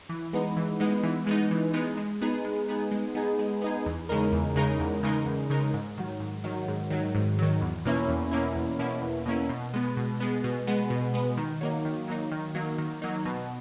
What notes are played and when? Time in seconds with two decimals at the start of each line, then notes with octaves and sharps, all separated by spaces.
0.09 E3
0.33 G#3 B3 D#4
0.56 E3
0.80 G#3 B3 D#4
1.03 E3
1.27 G#3 B3 D#4
1.51 E3
1.74 G#3 B3 D#4
1.97 G#3
2.22 B3 D#4 G#4
2.45 G#3
2.69 B3 D#4 G#4
2.91 G#3
3.15 B3 D#4 G#4
3.39 G#3
3.62 B3 D#4 G#4
3.86 E2
4.09 C#3 G#3 D#4 A#4
4.32 E2
4.56 C#3 G#3 D#4 A#4
4.80 E2
5.03 C#3 G#3 D#4 A#4
5.26 E2
5.50 C#3 G#3 D#4 A#4
5.74 G#2
5.98 D#3 F#3
6.20 G#2
6.44 D#3 F#3
6.68 G#2
6.90 D#3 F#3
7.15 G#2
7.39 D#3 F#3
7.61 E2
7.85 B2 A#3 C#4 E4
8.09 E2
8.31 B2 A#3 C#4 E4
8.55 E2
8.79 B2 A#3 C#4 E4
9.02 E2
9.26 B2 A#3 C#4 E4
9.49 B2
9.74 G#3 B3
9.97 B2
10.20 G#3 B3
10.44 B2
10.67 G#3 B3
10.90 B2
11.14 G#3 B3
11.37 D#3
11.61 F#3 A#3 D#4
11.85 D#3
12.08 F#3 A#3 D#4
12.32 D#3
12.55 F#3 A#3 D#4
12.78 D#3
13.02 F#3 A#3 D#4
13.25 B2